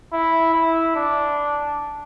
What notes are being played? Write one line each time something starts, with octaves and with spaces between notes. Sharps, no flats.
E4
E4
D4